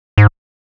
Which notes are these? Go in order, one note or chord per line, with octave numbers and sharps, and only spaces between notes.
G#2